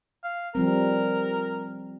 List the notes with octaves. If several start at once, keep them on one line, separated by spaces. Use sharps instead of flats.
F5
F3 G3 C4 A#4